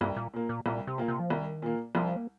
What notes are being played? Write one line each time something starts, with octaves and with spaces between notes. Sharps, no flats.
C2 G2
A#2
A#2 A#3
A#2
C2 A#2
C3
A#2 A#3
C3
F3
C2 D#3
A#2 A#3
C2 F3
A#3